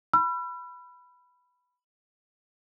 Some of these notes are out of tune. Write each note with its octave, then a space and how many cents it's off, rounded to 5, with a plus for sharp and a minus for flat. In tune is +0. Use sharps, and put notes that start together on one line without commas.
B5 +0 E6 +45